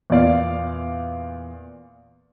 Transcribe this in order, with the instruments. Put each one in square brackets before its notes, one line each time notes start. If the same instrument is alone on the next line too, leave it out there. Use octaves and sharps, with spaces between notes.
[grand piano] E2 A#2 D5 F5